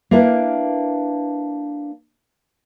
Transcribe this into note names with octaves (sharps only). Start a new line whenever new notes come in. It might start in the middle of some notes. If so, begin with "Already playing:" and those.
A#3 D4 E4 A#4 B4